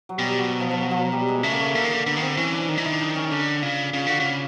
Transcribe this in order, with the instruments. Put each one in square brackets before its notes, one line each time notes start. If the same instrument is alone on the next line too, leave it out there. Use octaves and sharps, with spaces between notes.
[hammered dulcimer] F#3
[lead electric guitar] B2 [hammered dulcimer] G3
[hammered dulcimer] F#3
F3
F3
F#3
F3
F#3
G3
G#3
[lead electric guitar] C#3 [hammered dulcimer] A3
[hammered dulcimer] A#3
A3
[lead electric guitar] D3 [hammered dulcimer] A#3
[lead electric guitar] D#3
D3
[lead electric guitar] D3 [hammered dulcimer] B3
[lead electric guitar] D#3
[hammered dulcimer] C4
[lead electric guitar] D3
[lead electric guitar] E3 [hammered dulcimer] C#4
[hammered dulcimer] D4
[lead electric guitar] D#3 [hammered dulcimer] D#4
[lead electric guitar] E3
[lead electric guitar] D#3 [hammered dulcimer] E4
[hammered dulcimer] D4
D#4
C#4
[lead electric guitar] D3 [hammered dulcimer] D4
[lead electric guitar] C#3 [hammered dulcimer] F4
[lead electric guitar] C#3 [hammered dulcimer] F4
[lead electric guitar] D3 [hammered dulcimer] F#4
[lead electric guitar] C#3 [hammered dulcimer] F4